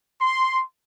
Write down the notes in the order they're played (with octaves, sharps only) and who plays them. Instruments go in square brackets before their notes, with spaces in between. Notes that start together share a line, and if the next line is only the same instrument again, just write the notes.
[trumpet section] C6